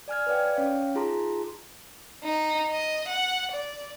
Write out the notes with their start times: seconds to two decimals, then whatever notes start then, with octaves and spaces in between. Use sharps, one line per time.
0.08 D5 G#5 F6 G#6
0.27 B4 C#5 D5 F5 G5
0.56 C#4 C#5 F5 G5
0.95 D#4 F4 G#4 A5 A#5 C6
2.23 D#4
2.71 D#5
3.08 F#5
3.51 D5